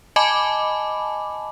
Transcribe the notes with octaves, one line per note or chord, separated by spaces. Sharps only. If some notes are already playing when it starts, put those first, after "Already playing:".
D#5 G#5 A5 B5 D6